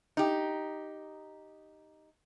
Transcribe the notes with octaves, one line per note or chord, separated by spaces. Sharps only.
D#4 G4